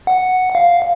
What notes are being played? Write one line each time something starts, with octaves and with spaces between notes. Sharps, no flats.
F#5
F5